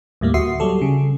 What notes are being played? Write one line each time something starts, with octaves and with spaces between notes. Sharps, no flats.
D#2 A2 G3 A#3
D2 F#4 E5 C6 D#6 C7
F#3 G3 A4
C#3